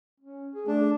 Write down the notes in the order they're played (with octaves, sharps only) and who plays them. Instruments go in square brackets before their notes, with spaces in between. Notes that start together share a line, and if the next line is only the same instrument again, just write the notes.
[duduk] C#4
G#4
[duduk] A3 [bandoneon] D4